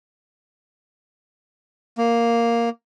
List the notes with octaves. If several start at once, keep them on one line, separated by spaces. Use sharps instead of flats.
A#3